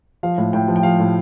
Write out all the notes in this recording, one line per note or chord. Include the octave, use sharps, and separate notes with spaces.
F3 F5
A2
A2 G5
F3
G5
F3 F5
A2